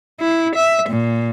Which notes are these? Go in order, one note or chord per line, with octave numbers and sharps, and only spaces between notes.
E4
E5
A#2